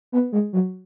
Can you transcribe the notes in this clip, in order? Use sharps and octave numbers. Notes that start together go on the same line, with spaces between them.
B3
G#3
F#3